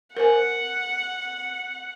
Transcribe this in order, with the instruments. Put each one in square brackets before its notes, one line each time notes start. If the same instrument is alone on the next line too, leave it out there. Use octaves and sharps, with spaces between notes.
[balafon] A#4 C5 G#5 [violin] F#5